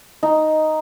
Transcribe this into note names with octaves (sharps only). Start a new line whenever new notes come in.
D#4